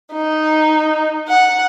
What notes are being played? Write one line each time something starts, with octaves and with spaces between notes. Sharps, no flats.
D#4
F#5